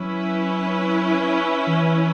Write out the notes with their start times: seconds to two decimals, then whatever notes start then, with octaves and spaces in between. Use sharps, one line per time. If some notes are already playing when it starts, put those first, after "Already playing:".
Already playing: F#3 C#4 E4 B4
1.67 E3